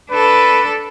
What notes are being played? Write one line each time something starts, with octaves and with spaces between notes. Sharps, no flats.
D4 A4 B4